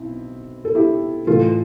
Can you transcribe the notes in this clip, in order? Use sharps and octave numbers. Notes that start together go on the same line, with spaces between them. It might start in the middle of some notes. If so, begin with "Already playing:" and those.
Already playing: B1 C4 E4
A4
E4 G4
A1 A2 E3 F4 A4